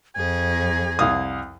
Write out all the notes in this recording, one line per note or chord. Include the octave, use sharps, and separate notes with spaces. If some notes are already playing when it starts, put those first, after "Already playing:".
F2 G#4 G#6
C2 F5 D#6